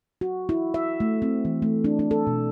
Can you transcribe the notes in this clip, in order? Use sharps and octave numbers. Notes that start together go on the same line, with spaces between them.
F#4
E4
E5
A3
C4
E3
A3
D4
D4
A4
B2